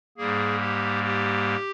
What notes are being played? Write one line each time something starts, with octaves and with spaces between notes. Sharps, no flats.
G#2 G3 A#3 G#4
G4
G4